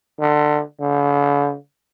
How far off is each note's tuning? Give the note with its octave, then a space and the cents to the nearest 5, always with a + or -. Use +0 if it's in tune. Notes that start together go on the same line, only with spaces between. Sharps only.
D3 +20
D3 -45